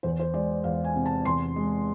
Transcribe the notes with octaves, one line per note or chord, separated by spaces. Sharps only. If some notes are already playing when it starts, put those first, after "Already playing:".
E2 C5
C5
G#3 D5
E2 F5
G#5
C3
A5
E2 C6
G#3